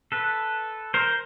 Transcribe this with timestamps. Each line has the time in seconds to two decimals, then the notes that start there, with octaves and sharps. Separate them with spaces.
0.12 A4 B4
0.94 A#4 C5